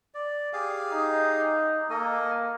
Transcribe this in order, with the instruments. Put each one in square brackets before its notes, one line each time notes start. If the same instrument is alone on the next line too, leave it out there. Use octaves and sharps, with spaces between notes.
[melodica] D5
G4 G#4 F5
[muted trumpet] D#4
[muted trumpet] A#3 [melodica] A4 D#5 G#5